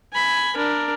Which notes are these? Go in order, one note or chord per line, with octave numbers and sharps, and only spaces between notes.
G#5 B5
D4 A#4